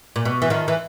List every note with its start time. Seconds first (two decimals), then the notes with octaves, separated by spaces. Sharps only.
0.16 A#2
0.25 B2
0.42 E3
0.50 D#3 F3
0.68 E3